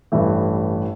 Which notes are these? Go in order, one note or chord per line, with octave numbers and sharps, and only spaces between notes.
A1 G2 E3 A3